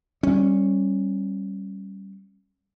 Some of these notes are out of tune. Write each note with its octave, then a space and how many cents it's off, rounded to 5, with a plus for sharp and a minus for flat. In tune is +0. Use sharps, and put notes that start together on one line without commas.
G3 -10 C#4 -20